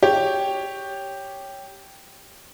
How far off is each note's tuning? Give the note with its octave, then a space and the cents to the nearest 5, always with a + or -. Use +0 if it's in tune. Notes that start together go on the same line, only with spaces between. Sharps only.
G4 +0 C#5 +0